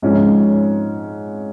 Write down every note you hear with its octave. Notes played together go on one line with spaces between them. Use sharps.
G#2 F3 G#3 C#4